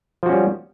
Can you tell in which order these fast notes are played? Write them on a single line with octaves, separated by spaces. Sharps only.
F3 F#4 C#4 G3